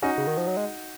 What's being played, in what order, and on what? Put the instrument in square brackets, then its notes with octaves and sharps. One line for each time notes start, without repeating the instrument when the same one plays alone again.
[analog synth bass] C#4 [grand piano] D#4 F#4
[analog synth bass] C#3
D#3
F3
F#3
G#3